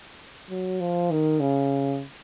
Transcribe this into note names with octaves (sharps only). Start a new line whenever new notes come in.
F#3
F3
D#3
C#3